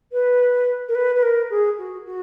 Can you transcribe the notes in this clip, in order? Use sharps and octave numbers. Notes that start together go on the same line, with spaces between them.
B4
A#4
B4
B4
A#4
G#4
F#4
F#4